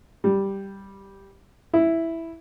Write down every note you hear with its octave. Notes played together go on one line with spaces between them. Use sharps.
G3
E4